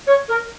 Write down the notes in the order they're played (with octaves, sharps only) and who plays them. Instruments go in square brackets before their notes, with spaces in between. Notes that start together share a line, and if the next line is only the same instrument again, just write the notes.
[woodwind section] C#5
A#4